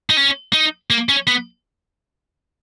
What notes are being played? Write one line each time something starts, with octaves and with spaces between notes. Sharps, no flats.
D#4
C#4
D#4
A#3
C#4
B3